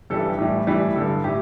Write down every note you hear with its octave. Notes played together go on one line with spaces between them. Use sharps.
G2 E3 G3 A4
B4
G4
A2 E3 G3
A2 E3 G3
G2 D3 G3 A4
A2 G4